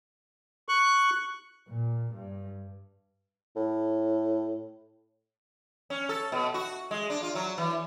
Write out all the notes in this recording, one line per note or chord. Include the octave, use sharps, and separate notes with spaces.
C#6 F#6
A#2
G2
A2
C#4
A4
B2
F#4
G#3
D4
F4
F#3
E3